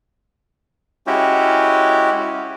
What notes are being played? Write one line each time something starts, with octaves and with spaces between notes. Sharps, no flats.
G#3 C#4 E4 F#4 G4